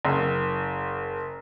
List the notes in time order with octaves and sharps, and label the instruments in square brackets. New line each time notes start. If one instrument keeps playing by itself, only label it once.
[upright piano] F#1